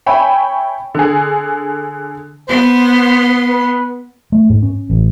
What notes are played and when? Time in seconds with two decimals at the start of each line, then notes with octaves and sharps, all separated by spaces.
0.06 C#5 E5 G5 G#5 B5
0.95 D3 G#4
2.48 B3 C5 C6
3.49 B4
4.32 A3
4.50 G#2
4.63 C#4
4.90 A1